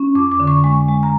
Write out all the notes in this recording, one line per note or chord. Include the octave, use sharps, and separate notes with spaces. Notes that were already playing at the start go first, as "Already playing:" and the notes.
Already playing: C#4
F2 D6
D6
D3
C#6
G#3 C#6
G#3
A#5